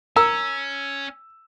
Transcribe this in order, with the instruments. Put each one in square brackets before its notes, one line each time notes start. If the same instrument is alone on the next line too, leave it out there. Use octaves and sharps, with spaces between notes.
[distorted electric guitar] C#4 [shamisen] A#4 [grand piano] E6